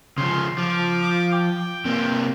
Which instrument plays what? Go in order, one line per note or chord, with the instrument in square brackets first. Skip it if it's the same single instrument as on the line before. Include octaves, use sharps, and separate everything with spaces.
[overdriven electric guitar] C#3 F3 [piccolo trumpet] C6
[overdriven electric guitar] F3 [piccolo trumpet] D6
[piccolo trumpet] G5
[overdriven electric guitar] C3 A#3